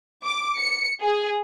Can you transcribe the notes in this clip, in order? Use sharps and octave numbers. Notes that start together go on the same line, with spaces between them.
D6
C#7
G#4